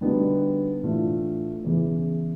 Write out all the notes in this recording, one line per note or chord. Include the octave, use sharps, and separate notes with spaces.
D3 G3 B3 D#4 F#4
A2 E3 A3 D4 F4
E2 C#3 E3